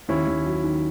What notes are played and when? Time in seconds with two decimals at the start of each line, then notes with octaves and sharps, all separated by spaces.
0.08 D#2 C#4 E4
0.26 D#2
0.46 F#3
0.64 D#3